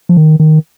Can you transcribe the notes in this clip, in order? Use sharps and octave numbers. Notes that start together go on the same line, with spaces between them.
F3
D#3
D#3